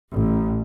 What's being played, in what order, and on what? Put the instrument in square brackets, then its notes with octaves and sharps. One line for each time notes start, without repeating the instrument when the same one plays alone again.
[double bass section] A1